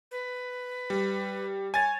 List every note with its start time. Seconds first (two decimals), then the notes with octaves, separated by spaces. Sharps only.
0.11 B4
0.90 G3
1.74 C#5 G#5 A6